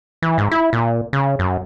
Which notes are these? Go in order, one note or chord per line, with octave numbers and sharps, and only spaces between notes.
E3
G#2
E4
A#2
C#3
F#2